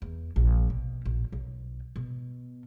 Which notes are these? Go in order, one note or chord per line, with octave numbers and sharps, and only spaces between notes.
E2
A#1
B2
A#1
B1
B2